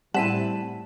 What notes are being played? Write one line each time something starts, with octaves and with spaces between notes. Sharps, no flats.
A2 G3 C4 E4 F#5 A5 B6 D#7